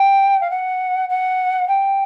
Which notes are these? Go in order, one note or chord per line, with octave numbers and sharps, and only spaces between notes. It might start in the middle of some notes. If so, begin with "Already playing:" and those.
Already playing: G5
F5
F#5
F#5
G5